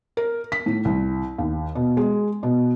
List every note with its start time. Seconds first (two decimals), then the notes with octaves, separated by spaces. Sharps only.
0.17 A#4
0.52 B6
0.66 A2
0.85 C2
1.38 D#2
1.75 B2
1.97 G#3
2.43 B2